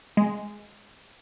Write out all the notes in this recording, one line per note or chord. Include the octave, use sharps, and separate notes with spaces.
G#3